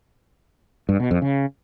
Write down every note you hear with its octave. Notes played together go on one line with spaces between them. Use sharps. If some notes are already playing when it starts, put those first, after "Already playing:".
G2
B2
F2
C#3